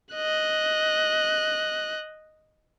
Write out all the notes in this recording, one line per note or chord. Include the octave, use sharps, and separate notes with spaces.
D#5 F#6